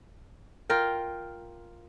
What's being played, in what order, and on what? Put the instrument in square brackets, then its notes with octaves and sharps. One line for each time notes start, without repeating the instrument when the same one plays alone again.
[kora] F4 A#4 G5